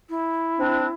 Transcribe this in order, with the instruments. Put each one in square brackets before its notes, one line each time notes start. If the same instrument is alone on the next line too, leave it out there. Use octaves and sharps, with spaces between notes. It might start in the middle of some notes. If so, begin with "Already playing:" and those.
[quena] E4
[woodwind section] C4 D4